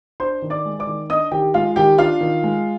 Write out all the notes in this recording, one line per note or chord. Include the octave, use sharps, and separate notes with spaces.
D4 C5 C6
D#3
D5 D6
G#3
D5 D6
D#3
D4 D#5 D#6
D#3 G4 G5
G#3 F4 F5
D#3 G4 G5
D4 F4 F5
D#3
G#3